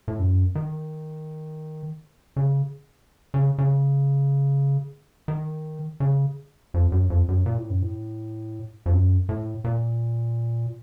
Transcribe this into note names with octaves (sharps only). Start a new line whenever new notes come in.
A2
F#2
D#3
C#3
C#3
C#3
D#3
C#3
F2
F#2
F2
F#2
A#2
A2
F#2
A2
F2
F#2
A2
A#2